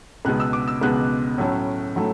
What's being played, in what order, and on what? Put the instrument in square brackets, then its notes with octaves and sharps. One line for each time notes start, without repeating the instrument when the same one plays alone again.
[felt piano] C#2 B2 G#3 B3 F#6
E6
D6
E6
C#2 B2 G#3 B3 F#6
A2 F#3 A3 C#4
A2 F#3 A3